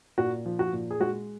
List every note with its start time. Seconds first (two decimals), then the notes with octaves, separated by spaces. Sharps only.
0.18 A#2 F#4
0.46 F3
0.59 F#4
0.73 A#2
0.91 G#4
1.00 G#3 F#4